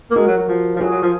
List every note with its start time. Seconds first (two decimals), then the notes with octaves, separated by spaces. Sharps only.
0.11 A#3
0.16 G#3 F#4 A#4
0.27 F#3
0.38 F#3
0.48 F3
0.76 F3
0.80 F#3 F4 G#4
0.91 F#3
1.02 F3